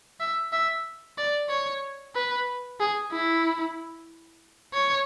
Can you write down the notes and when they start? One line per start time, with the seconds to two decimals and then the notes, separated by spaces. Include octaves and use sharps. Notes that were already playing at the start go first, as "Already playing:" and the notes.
0.20 E5
0.52 E5
1.18 D5
1.49 C#5
2.15 B4
2.80 G#4
3.12 E4
4.74 C#5